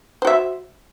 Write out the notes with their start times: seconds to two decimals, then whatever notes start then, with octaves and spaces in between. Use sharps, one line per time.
0.22 C5
0.25 F#4
0.27 E5